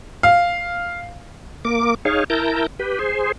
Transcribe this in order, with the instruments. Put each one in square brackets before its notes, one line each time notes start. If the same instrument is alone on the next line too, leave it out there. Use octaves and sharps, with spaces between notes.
[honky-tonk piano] F5
[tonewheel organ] A#3 D6
D#4 G#4 C#5 F5
E4 A#4 A5 A#5 G6
G4 B4
G#4 C5